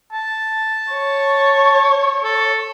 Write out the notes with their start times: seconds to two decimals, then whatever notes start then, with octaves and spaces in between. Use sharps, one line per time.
0.12 A5
0.92 C#5
2.24 A4